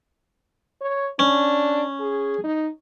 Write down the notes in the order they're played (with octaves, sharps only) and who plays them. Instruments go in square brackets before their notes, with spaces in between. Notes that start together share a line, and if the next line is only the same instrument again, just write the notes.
[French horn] C#5
[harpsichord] C#4 [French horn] D4
[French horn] G#4
D#4